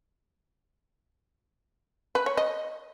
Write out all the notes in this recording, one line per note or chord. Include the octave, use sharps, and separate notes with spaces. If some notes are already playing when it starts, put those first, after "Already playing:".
B4
C#5
D#5